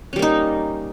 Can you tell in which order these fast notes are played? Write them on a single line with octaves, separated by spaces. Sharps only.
C#4 G3 A#3 D#4